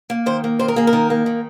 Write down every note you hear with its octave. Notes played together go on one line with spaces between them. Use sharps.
A#3
D#3 C5
A#3
D#3 C5
A#4
A#3 G#4
A#4
D#3
A#3
D#3